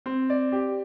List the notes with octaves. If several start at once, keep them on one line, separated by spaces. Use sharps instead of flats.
C4
D5
G4